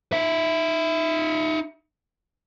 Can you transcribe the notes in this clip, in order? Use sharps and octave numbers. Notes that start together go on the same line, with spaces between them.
D#4 E5